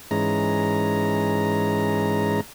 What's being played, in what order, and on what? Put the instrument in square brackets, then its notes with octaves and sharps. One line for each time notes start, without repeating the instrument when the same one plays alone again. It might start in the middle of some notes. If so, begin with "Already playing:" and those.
[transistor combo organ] G#2 E3 G#3 C#4 A#5